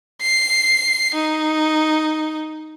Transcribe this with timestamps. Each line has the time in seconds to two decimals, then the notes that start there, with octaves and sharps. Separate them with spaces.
0.21 C7
1.15 D#4